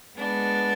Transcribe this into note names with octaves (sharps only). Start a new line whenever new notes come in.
G#3 B3 D4